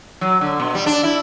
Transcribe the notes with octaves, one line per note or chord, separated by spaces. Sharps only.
F#3
D3
B2
G3
D4
E4